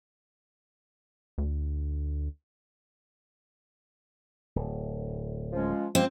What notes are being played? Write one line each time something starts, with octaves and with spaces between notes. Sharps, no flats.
D2
D1
F3 G#3 C#4
F3 G#3 A#3 C4